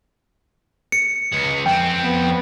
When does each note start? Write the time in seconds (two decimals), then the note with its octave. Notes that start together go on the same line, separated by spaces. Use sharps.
0.92 C#7
1.32 C#2 G#4
1.66 F2 C4 G5
2.03 B3